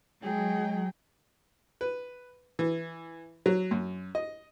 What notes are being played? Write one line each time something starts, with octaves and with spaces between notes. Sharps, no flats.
F#3 G#3 G#4 G5
B4
E3
F#3
F#2
D#5